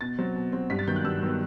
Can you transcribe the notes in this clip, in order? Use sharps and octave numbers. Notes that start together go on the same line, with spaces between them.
B2 A6
F#3 C4
B2
F#3 C4
G2 B6
A6
D#3 F#3 B3 G6
F#6
G2 E6
D#3 F#3 B3